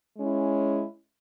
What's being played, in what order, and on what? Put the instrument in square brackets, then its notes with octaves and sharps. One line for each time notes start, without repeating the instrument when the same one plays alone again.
[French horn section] G#3 C#4 E4